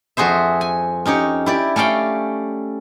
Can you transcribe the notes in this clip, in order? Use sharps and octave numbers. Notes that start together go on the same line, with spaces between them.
F2 F#4 G#4 C5 E5
G#5
C#4 D#4 G4 C#5
E4 G4 D5
A3 C#4 D5 F5 G5